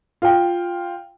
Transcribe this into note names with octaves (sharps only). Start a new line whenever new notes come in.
F4 G5